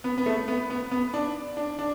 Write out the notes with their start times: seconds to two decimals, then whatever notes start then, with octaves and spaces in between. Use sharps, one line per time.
0.04 B3
0.18 B3
0.26 A3
0.48 B3
0.70 B3
0.91 B3
1.14 D4
1.57 D4
1.79 D4